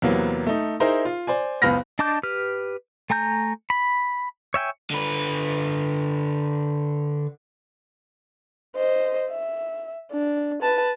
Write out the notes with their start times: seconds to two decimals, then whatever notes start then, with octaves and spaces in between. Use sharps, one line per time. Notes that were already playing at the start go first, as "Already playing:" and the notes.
0.02 E2 C3 F#3 A#3 B3
0.47 A3 D#4
0.80 D#4 E4 G#4 A#4 C5
1.05 F4
1.27 C5 D5 G#5
1.62 F#1 C#2 B3 B5 F6 A#6
1.99 D4 D#5 A5 D6 G6
2.23 G4 B4 F6
3.10 A3 G#5 A#5 G6
3.70 B5
4.54 C#5 E5 G5 G#5
4.90 D3 B4
8.76 C5 D#5
9.30 E5
10.12 D4
10.62 B4 A5